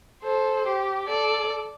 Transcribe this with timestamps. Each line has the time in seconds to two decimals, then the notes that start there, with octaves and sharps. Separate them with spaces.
0.23 A4 C5
0.67 G4
1.08 A4 D5